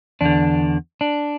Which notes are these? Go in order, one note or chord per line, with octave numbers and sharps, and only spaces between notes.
E2 D3 D4
D4